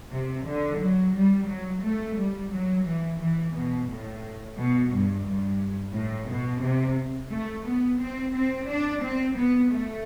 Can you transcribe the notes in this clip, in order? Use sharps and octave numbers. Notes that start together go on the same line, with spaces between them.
C3
D3
F#3
G3
F#3
A3
G3
F#3
E3
E3
B2
A2
B2
G2
G2
A2
B2
C3
A3
B3
C4
C4
D4
C4
B3
A3